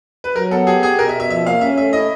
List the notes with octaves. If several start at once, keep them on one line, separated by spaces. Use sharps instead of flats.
B4
F#3 A#4
B3 A4
G4 G#4
G4 G#4
B2 A#4
E5
B2
E5
F3 E5
A#3 F5
C#4 E5
A3 E5
E4 D#5